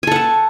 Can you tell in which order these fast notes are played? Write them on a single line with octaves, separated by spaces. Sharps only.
G#5 A4 F#5 A5